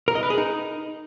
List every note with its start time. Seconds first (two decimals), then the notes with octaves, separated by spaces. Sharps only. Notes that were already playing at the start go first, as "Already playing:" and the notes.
0.08 A#4
0.15 D#5
0.23 B4
0.30 G#4
0.38 D#4